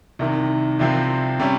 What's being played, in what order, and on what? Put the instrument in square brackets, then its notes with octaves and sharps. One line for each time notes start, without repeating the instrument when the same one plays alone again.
[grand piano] C2 C3 D#3
C2 C3 F3 C4
C3 G3 C#4